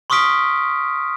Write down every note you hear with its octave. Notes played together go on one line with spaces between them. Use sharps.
C6 C#6 D#6 F6 B6 D7